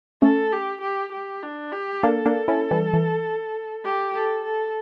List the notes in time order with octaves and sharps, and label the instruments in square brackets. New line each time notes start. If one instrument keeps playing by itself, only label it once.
[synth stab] A3 C#4 [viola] A4
[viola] G4
G4
G4
D4
G4
[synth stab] A#3 D4 [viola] A4
[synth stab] A#3 D4
C#4 E4
E3 G3
E3
[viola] G4
A4
A4